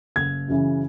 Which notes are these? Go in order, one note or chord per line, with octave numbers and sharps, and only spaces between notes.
F#1 G#6
F#2 C#3 E3